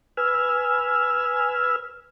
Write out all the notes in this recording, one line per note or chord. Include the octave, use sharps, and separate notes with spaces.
B4 G#5 E6 F6